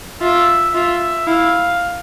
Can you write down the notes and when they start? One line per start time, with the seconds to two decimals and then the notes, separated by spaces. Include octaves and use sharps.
0.22 F4 E5
0.75 F4 E5
1.27 E4 F5